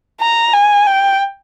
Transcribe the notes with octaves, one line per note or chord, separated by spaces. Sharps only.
A#5
G#5
G5